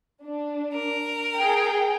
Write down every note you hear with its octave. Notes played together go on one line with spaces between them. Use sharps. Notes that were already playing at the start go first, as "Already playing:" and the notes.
D4
A#4
G#4 G5